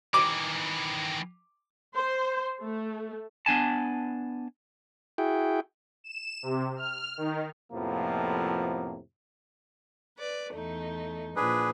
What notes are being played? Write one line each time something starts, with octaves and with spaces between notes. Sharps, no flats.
D#3 E3 D6
C5
A3
B3 D4 G#5 A5
E4 F#4 G#4 G5
E7
C3
F6
D#3
F2 A2 C3 F3 A#3 B3
B4 D5
E2 A3 D#4
A#2 E3 F3 D4 G#4 B4